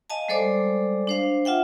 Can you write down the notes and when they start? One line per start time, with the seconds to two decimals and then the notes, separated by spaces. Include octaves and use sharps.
0.10 D#5 F5 G#5 A5
0.28 G3 G#3 A4 C5 D5 D6
1.07 D4 C5 F5
1.45 F4 E5 F#5 G5